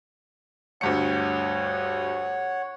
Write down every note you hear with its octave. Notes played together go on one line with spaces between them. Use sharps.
D2 G2 C#5 F#5 C#7